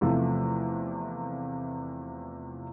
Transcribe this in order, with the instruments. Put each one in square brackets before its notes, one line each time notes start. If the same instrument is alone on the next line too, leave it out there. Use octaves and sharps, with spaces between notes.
[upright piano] E2 C3 F3 A3